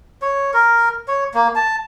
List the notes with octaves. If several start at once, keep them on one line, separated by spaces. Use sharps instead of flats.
C#5
A#4
C#5
A#3
A5